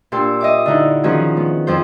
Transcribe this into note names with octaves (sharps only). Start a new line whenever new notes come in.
A#2 D4 G4 C6 E6
D#5 E5 D6
D3 D#4 E4
D#3 F3 C#4 F#4 G#4
B3
F2 F3 C5